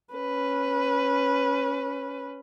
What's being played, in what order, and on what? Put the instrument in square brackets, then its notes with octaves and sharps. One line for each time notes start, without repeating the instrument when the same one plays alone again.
[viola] C#4 B4